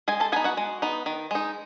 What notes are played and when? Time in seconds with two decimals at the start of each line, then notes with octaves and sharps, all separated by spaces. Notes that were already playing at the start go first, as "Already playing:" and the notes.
0.08 G#3 G#4 G#5
0.20 A4 A5
0.32 B3 G#4 G#5
0.36 D#4
0.44 F#4 F#5
0.57 G#3
0.82 B3 D#4
1.06 D#3
1.31 G#3 D#4